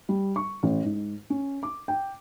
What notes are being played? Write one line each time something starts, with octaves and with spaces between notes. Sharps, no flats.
G3
C#6
A1
G#2
C#4
D6
G5